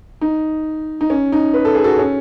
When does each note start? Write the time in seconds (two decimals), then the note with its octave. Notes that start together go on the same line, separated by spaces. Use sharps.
0.21 D#4
1.01 D#4
1.10 C#4
1.32 D#4
1.54 B4
1.65 A4
1.74 G#4
1.84 F#4 A4
1.99 C#4